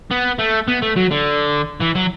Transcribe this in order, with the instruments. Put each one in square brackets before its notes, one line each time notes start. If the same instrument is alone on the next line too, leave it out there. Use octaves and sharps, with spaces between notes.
[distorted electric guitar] B3
A3
B3
A3
F#3
D3
E3
F#3